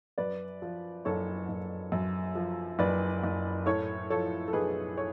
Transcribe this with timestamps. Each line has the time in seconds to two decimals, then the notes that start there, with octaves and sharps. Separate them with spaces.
0.18 F#2 B4 D5
0.62 F3
1.05 F#1 A4 C#5
1.49 F#1
1.92 F#2
2.35 F3
2.79 F#1 B4 D5
3.24 F#1
3.66 A2 A4 C#5
4.10 F3 A4 C#5
4.48 A4
4.53 B1 G#4 B4
4.97 A4 C#5